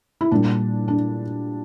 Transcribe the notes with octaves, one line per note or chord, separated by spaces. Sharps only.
E4
A#2 G3 D4
D4